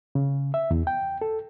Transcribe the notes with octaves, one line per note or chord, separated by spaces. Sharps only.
C#3
E5
E2
G5
A4